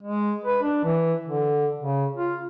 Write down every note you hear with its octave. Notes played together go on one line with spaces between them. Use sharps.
G#3
B4
D4
E3
D3
C#3
F4